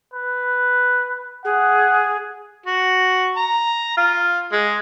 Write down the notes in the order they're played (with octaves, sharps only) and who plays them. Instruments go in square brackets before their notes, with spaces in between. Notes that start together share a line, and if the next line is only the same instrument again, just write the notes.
[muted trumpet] B4
[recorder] G#4 [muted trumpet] F#5
[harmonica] F#4
A#5
F4
G#3